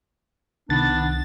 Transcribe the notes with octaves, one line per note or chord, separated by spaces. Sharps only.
C2 D#3 B3 D4 A6